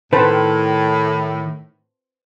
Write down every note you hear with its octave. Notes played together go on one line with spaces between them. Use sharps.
A2 D#3 B4 C5 A5